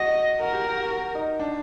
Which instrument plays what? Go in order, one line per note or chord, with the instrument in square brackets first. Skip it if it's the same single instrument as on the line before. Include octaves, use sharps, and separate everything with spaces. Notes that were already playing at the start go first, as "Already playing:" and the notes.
Already playing: [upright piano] F#4 [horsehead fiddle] D#5
[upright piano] F#4 [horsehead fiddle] A#4
[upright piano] G4
F#4
F#4
F#4
D#4
D4